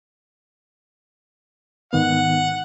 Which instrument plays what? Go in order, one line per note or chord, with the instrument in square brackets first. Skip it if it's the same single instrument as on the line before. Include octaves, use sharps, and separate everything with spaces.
[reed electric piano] G#2 D#3 B3 [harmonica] F#5